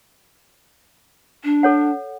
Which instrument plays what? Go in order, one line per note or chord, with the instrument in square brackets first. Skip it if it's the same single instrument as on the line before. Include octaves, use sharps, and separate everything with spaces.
[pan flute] D4
[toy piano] A4 C#5 F#5